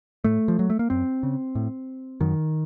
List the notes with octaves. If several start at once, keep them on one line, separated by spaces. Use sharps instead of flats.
A2 A3
F3
F#3
A3
A#3
F#2 C4
C#3
A2
F#2 D#3